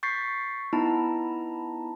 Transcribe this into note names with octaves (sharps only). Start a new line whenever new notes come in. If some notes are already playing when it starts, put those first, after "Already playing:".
C#6 G6 A6 B6 C7
B3 D#4 E4 A5 A#5